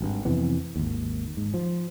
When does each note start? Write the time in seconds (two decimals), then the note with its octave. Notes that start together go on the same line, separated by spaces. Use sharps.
0.01 G#1 G2
0.25 F2 C3 E3 B3
0.76 G#1 D#2
1.37 G#2
1.54 F3